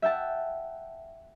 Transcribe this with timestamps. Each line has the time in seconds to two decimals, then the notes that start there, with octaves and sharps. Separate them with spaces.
0.02 E5 F#5 G5 A5